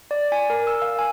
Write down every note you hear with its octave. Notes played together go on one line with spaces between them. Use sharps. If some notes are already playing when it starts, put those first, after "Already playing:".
D5
G#5
A#4
E6
F5
G#5